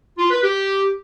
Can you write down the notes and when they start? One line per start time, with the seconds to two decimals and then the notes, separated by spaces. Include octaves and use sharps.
0.18 F4
0.30 B4
0.42 G4